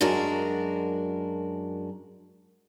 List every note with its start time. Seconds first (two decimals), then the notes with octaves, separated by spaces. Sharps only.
0.01 F#2 G#3 D4 F#4 A#4